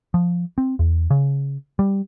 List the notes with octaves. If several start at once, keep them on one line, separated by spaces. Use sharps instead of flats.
F3
C4
E2
C#3
G3